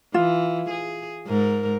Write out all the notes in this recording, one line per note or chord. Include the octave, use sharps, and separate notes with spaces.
E3 F4
G#4
G#2 A#4